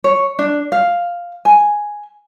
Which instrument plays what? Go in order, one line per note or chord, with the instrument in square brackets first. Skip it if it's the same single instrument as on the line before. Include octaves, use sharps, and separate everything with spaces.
[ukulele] C#5
D4
F5
G#5